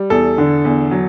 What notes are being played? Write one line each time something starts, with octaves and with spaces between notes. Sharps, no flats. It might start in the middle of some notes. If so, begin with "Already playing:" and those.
Already playing: G3
E2 A4
D3
E2
F#3